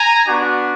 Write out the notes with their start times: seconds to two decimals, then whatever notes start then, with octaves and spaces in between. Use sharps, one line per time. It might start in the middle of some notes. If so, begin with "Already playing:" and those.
Already playing: G#5 A#5
0.27 B3 D4 F#4